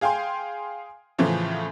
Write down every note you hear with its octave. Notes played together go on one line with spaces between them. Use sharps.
G#4 F5 G5 G#5 C6
A2 C#3 E3 F3 A3